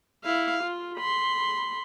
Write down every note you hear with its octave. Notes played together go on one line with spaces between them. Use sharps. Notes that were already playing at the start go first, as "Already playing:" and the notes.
E4 F5
F4
B5 C6